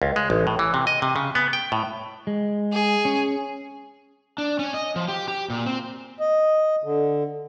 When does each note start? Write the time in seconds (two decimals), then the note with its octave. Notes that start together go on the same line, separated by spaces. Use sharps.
0.02 C#2
0.16 G#3
0.30 A1
0.47 A2
0.59 E3
0.74 C3
0.87 D#5
1.02 C3
1.16 C#3
1.35 B3
1.53 G5
1.72 A2
2.27 G#3
2.72 G#4
3.05 C#4
4.38 D4
4.59 C#4
4.74 D#5
4.96 F3
5.08 G4
5.28 G4
5.50 A#2
5.66 C4
6.20 D#5
6.84 D3